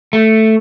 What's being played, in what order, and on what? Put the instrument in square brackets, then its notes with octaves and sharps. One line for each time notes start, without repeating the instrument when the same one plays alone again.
[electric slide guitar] A3